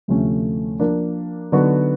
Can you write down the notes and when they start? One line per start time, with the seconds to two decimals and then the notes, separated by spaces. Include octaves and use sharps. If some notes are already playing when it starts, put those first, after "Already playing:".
0.08 D2 C3 F3 A3 C#4
0.80 F3 A#3 D4
1.52 D3 F#3 B3 D#4 F#4